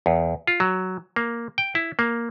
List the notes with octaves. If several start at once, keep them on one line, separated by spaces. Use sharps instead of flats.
E2
F4
F#3
A#3
G5
E4
A#3